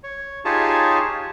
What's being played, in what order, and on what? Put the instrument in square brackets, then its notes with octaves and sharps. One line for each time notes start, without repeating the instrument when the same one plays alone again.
[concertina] C#5
D#4 F4 G4 G#4 C#5 A5